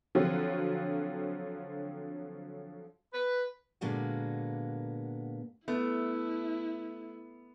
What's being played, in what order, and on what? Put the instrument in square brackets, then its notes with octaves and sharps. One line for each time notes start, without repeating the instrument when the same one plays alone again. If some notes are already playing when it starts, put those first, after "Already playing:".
[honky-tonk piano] D3 F3 F#3 C4 F4 F#4
[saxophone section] B4
[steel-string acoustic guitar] A#2 D3 G#3 A#3 B3 F#4
[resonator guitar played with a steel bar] A3 [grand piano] B3 [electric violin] E4